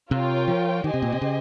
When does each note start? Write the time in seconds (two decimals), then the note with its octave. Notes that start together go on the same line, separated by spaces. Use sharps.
0.11 C3 F4 A#4 C#5 G5
0.47 F3
0.84 D#3 G4 C5 D#5 G#5
0.94 C3
1.02 A#2
1.12 C3
1.22 C#3